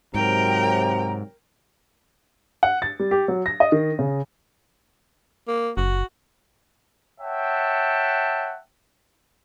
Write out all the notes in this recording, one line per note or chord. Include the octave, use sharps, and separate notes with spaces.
G#2 C3 F#3 A#4 G5 A#5
F#5
A6
G3
G4
F#3
A#6
D#5
D#3
C#3
A#3
F#1 F#4
C#5 E5 F#5 G5 A5